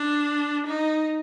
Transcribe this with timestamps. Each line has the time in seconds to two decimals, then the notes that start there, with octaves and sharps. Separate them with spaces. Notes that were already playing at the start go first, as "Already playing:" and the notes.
Already playing: D4
0.66 D#4